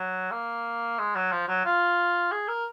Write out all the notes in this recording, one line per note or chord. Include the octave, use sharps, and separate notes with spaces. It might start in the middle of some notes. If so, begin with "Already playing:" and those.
Already playing: F#3
A#3
G#3
F#3
F3
F#3
F4
G#4
A#4